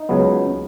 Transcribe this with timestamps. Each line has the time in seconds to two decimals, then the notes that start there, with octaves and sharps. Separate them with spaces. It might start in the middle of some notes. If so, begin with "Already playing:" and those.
Already playing: D#4
0.09 C#2 C#3 F#3 B3